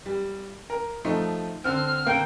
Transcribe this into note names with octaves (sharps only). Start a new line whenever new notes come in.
G3
A#4
F3 A3 D#4
D3 C4 F6
D3 A#3 G5